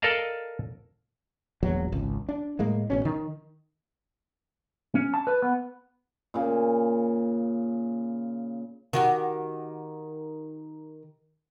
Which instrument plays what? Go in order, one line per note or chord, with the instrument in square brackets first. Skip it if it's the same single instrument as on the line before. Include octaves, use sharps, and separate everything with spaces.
[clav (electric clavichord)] A4 A#4 D5 D#5 F5 A5
[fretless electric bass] E1 A#1 E2 F#3
G#1 C#2
D4
A2 G#3 A#3
A1 B2 C#4
D#3
[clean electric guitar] C#4
A5
B4
B3
[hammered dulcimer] A#2 C#3
[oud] D#3 F#4 G4